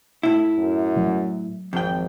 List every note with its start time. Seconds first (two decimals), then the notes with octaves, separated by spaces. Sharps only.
0.23 A2 E4
0.58 F#2
0.96 F#3 A3
1.73 G#1 F2 G5